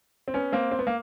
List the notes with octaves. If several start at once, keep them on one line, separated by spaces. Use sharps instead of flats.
C4
B3 C#4
A#3 C4
C4
B3
A#3